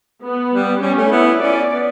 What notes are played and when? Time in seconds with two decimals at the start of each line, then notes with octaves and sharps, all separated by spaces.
0.23 B3
0.53 G3
0.82 G3 C#4
0.98 A3
1.12 B3 E4
1.42 C#4 D5
1.72 B3